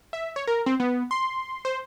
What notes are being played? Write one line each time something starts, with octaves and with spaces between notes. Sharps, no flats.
E5
C#5
A#4
C4
B3
C6
C5